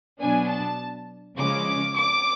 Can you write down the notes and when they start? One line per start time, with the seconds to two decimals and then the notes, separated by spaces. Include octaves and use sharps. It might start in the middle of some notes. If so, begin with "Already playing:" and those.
0.20 B2 F#3 B3 D4 G#5
0.49 A5
1.37 C#3 F3 G#3 C#4 D6
1.95 D6